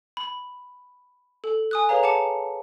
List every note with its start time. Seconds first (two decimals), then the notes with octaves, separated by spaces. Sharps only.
0.17 B5
1.44 A4
1.71 G#5 D#6 F#6
1.89 G#4 B4 C#5 F5 A#5
2.03 F#5 A5 D6 C#7